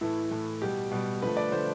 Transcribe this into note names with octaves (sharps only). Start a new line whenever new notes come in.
A2 E3 A3 E4
A2 E3 A3
B2 G3 G4
B2 G3
D3 F3 A3 B4
D5
D3 F3 A3 C5